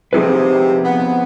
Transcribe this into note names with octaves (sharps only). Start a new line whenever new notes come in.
C3 F3 C4 D#4 G#4 B4
B3